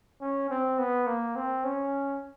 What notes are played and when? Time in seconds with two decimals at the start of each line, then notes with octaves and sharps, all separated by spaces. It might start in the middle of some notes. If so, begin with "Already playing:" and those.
0.21 C#4
0.50 C4
0.79 B3
1.07 A#3
1.36 C4
1.64 C#4